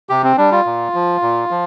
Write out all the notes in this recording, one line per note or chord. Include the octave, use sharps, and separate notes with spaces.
C3 G4
C4
G3 D4
F4
A#2
F3
A#2
F3